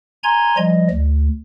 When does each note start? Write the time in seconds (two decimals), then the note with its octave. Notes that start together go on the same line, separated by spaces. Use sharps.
0.24 G#5 A#5 C6 G#6
0.57 F3 G3 D#5
0.90 D2